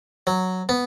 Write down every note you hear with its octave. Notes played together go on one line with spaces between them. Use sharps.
F#3
B3